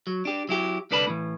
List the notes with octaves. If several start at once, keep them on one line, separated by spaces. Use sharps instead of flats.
F#3
D4 G4
F#3 E4 G4
C2 D3 B4 D5 A5 B5
A2 E3